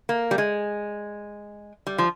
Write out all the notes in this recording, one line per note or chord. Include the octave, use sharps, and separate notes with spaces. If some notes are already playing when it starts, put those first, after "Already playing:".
A#3
G3
G#3
G3
F3